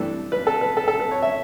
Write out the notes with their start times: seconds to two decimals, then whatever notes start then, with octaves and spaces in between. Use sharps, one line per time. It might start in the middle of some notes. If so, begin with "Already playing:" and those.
Already playing: G2 E3 A3 D4 A4
0.32 B4
0.47 A4
0.61 B4
0.77 A4
0.88 A4
1.00 B4
1.11 C#5
1.22 E5